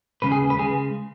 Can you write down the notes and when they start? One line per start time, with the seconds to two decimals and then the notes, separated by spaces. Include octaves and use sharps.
0.22 D#2 C#3 G#3 B4
0.32 G#4
0.50 B4
0.59 C#3 G#3 G#4